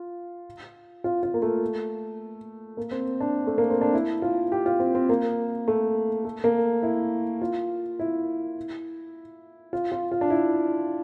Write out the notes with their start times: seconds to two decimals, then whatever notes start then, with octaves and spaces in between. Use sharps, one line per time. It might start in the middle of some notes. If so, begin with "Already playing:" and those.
Already playing: F4
1.04 F4
1.23 F4
1.34 A#3
1.42 A3
2.77 A#3
2.91 C4
3.20 D4
3.47 A3
3.58 A#3
3.70 C4
3.81 D4
3.93 E4
4.22 F4
4.52 G4
4.66 F4
4.80 C4
4.95 C4
5.09 A#3
5.68 A3
6.24 A3
6.44 A#3
6.83 E4
7.41 F4
7.99 E4
9.73 F4
9.92 F4
10.11 F4
10.21 D4
10.30 E4